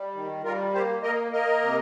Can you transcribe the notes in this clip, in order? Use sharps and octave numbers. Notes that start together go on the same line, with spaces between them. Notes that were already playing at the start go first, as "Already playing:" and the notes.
Already playing: G3
D#3
G3 F4 A#4
A#3 G4 C5
A#3 A#4 D#5
A#3 A#4 D#5
C3